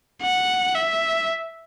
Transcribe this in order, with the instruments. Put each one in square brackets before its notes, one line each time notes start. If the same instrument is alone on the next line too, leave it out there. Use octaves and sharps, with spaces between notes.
[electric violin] F#5
E5